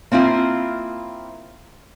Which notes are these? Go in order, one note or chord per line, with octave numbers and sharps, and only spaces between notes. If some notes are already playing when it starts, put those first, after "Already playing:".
A#3 C4 E4 F4